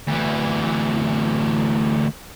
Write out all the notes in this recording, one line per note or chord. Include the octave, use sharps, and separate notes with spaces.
D2 E3